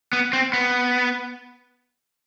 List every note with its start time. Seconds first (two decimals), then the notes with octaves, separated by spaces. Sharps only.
0.13 B3
0.33 C4
0.53 B3